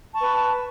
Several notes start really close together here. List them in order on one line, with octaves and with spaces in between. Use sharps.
A5 C#6 B4